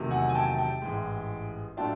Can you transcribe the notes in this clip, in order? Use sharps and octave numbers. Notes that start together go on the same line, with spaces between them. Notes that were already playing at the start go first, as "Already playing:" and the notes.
Already playing: E2 C3 D#3 F#3 A3
F#5 G#5
G#5
G5 A5
G5 A5
A1 G#2 E3 G#3
A2 F#3 A3 D4 F4 G5 A5